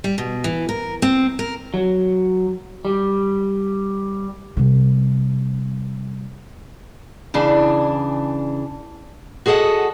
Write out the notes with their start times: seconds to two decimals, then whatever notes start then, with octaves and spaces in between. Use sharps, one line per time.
0.04 G3
0.18 B2
0.44 E3
0.69 A#4
1.02 C4
1.39 A#4
1.74 F#3
2.85 G3
4.57 C3 G3
7.34 C#3 E3 D4
9.46 F#4 G#4 A4 D#5 F#5